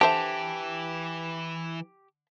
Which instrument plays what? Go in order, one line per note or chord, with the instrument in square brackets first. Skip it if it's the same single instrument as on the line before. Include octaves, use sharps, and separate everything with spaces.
[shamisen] D3 C5 E5 [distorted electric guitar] E3 [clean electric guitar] G4 [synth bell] A5